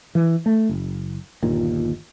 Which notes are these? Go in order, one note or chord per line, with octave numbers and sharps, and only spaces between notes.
E3
A3
F#1
G1 D#2 A#2